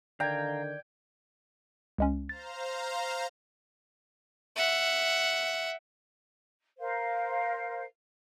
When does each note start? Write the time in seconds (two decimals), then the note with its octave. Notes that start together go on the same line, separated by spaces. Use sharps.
0.20 D3 D#3 D5 F5 G5 A#5 G#6
1.98 C#2 G#3 C#4
2.29 C5 F5 A#5 A6
4.56 E5 F#5
6.79 A#4 C5 F5